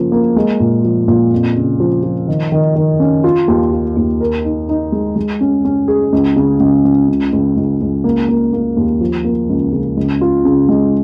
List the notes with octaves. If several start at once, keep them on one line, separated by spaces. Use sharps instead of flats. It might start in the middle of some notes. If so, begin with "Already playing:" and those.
Already playing: C#3 F3 A#3
A#3
G#3
A#2
F3
A#2
F2
C#3
F3
F3
D#3
D#3
D#3
C#4
F4
D#2
F4
D#2
A#4
D#4
D#4
G#3
G#3
C#4
C#4
G#4
C#2
C#3
C#2
C#2
C#3
C#2
C#2
C#2
A#3
A#3
A#3
D#2
F3
A#3
C#2
C#3
C#2
F4
C#3
G#3